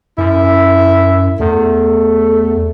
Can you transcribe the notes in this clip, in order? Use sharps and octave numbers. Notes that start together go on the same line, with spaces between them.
F#2 E4
E2 A3